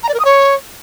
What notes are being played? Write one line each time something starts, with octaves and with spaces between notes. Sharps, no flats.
A#5
D5
A#4
D#6
C#5